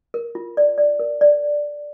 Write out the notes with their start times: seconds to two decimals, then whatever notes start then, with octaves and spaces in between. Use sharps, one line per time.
0.14 A#4
0.35 F4
0.57 D5
0.78 D5
0.99 A#4
1.21 D5